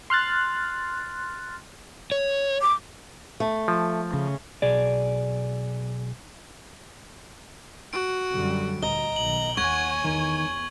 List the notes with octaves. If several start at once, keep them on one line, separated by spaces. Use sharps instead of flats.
C6 F6 F#6 A6
C#5
D6
A3
F3
C#3
B1 G#4 D5
F#4 D7
F#2 D3 G3
D2 A#2 D#5 A#5 G7
B1 D#3 F#7
D#2 C#5 F#5 G#5 C#6 G#6
E2 D#3